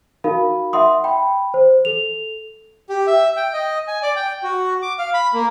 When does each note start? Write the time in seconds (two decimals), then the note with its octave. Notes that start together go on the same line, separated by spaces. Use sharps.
0.24 D#4 F#4 A#4 F5 B5
0.73 E5 F#5 C6 D#6
1.04 G5 B5
1.54 C5
1.85 A4 F7
2.89 G4
3.07 E5
3.36 G5
3.53 D#5
3.88 G#5
4.02 D5
4.16 G5
4.43 F#4
4.82 D6
4.99 F5
5.14 B5
5.34 A#3